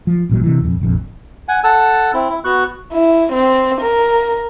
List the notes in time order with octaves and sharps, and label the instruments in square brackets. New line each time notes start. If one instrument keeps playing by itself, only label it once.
[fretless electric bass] F3
A1 A#2 F#3
C3 E3
D#1 F2
F1 A#1 F2
[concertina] F#5 G#5
A4 F#5 A5 E6
C4 E4
E4
B3 F#4 C#6 F#6
[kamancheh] E4
C4
A#4